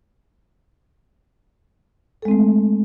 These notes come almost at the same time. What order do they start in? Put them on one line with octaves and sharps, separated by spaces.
A4 G#3 C4 A3